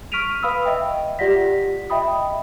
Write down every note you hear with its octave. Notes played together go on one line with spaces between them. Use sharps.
C#6 F6 B6 D7 D#7 F7
B4 F5 B5 D#6 E6
D#5 E5 G5
F4 G4 D5 F#5 A#6 B6
D#5 E5 G5 B5 D#6